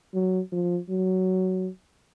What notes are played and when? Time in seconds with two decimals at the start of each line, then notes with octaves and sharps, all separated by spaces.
0.14 F#3
0.52 F3
0.90 F#3